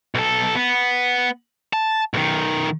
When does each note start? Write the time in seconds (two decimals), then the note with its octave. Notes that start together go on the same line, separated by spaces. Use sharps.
0.15 B1 A4
0.55 B3
1.73 A5
2.14 B1 D#3